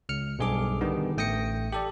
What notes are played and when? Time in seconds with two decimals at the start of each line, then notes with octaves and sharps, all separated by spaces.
0.09 C#2 F6 C#7
0.39 B1 G2 G#4 A4 D6
0.81 D3 D#3 G3 B3
1.17 A1 A3 G5 D#6 A#6 C#7
1.72 G4 A4 D5